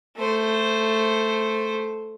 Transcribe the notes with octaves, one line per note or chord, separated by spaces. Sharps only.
A3 C5